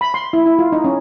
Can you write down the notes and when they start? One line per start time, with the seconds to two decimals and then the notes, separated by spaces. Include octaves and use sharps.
0.01 B5
0.14 C6
0.33 E4
0.46 E4
0.59 F4
0.72 D#4
0.84 C#4